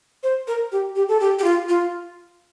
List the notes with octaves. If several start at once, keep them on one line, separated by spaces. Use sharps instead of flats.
C5
A#4
G4
G4
A4
G4
G4
F4
F4